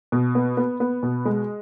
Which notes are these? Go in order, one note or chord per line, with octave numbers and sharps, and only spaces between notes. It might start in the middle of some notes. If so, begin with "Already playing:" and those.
B2
B3
B3
B3
B2
G#3